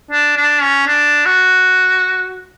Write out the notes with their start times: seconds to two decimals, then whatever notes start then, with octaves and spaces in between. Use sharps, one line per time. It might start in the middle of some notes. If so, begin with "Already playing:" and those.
0.11 D4
0.36 D4
0.61 C#4
0.87 D4
1.25 F#4